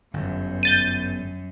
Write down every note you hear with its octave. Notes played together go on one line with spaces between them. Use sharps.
G1 F#2
G6 A6 D#7